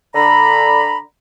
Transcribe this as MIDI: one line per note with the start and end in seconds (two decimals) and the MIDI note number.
0.15 0.98 50
0.15 0.98 82
0.15 0.98 83